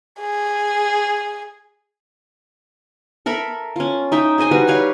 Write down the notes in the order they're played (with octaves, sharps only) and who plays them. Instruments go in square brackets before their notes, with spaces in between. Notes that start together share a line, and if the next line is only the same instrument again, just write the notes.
[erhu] G#4
[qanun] A4 A#4 E5 B5
C#4 F4
D#4 E5 G5
G#4 C5 D#5 G#5
G3 F#4 B4 G#5
G4 B4 C#5 F5